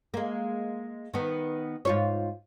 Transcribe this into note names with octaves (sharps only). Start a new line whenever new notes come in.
G#3 A#3
D#3 B3
G#2 F4 C#5